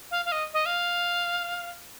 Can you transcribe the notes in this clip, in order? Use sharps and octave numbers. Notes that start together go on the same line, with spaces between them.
F5
F5
D#5
D#5
F5